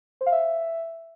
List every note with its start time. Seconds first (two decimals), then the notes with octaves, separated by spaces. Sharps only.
0.21 C5
0.26 F5
0.32 E5